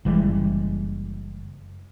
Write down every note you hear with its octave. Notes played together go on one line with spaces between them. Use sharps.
F#1 E3 G3 G#3